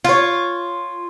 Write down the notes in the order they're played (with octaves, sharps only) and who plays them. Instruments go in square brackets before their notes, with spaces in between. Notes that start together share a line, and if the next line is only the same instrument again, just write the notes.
[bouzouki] F4 C#5